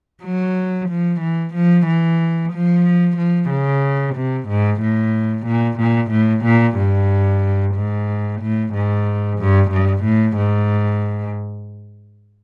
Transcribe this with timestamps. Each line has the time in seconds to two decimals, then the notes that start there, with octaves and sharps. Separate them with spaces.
0.23 F#3
0.89 F3
1.21 E3
1.55 F3
1.87 E3
2.53 F3
3.17 F3
3.50 C#3
4.15 C3
4.49 G#2
4.82 A2
5.47 A#2
5.79 A#2
6.11 A2
6.45 A#2
6.77 G2
7.75 G#2
8.42 A2
8.74 G#2
9.39 G2
9.71 G2
10.05 A2
10.37 G#2